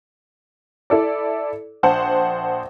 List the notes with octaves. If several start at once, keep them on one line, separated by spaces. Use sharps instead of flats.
E4 A4 D5
A#1 C5 F#5 A5